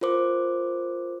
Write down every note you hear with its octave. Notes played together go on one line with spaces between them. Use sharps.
F4 A#4 C5 D6